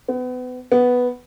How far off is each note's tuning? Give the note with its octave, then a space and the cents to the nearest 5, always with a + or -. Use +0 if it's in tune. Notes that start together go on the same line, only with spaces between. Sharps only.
B3 +30
B3 +0